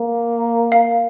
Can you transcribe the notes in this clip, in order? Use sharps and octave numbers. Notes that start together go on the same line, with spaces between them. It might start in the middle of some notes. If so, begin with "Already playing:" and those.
Already playing: A#3
F5